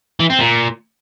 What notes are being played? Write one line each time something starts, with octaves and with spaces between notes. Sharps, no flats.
E3
C4
A#2